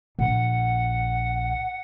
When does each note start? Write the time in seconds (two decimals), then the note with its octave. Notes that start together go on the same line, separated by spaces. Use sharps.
0.19 A#1 F#5